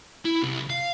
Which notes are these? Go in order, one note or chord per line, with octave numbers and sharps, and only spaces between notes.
E4
C2
F5